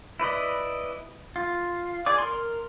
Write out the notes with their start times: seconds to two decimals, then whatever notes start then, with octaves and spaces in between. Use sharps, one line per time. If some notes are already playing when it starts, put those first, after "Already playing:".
0.20 E4 B4 D5 D#5
1.36 F4
2.06 G#4 D5 D6
2.18 A#4 C6